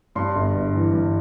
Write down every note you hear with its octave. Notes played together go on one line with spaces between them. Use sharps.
G2 C6
G1
G1
E3
G2